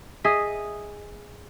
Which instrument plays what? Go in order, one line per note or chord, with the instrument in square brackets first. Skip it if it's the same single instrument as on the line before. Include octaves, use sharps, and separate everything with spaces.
[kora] G#4 D#5 E5